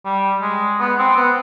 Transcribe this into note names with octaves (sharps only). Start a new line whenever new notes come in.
G3
G#3
B3
C4
B3